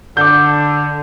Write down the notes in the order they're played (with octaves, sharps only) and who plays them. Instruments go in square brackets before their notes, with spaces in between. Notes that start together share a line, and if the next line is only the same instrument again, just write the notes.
[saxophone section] D3 [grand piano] D6 G6